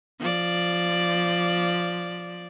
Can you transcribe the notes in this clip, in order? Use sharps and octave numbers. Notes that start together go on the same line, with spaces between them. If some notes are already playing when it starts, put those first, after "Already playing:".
F3 D5